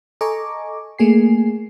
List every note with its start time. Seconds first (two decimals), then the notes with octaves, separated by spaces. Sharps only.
0.21 A4 D#5 G#5 A#5 C#6 D6
0.99 A3 A#3 G#4 G#5 C7